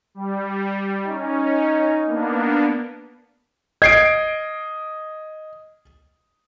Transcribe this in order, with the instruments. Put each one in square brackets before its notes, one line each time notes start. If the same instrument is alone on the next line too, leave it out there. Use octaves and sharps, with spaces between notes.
[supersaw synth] G3
[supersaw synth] C#4 [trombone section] D#4
[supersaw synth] A#3 B3 D4
[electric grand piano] D#5 [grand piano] G#6 C7 D7